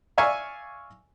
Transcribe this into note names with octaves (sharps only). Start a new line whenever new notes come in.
D5 E5 F5 G#5 C#6